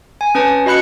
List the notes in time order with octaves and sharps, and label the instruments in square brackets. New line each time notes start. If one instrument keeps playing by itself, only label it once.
[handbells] G#5
C#4 B4 A5
F#4 D#5 B5 F#6 C#7